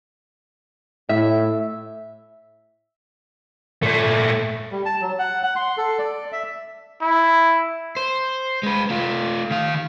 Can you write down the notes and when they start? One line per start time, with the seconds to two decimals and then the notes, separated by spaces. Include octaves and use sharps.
1.09 A2 E5
3.83 A#2 A3
4.72 G3
4.85 A5
5.01 F#3
5.19 F#5
5.43 F#5
5.56 C6
5.78 A4
5.99 D5
6.32 E5
7.02 E4
7.97 C5
8.63 G#3 B4
8.90 A3 F4
9.51 D#3 F5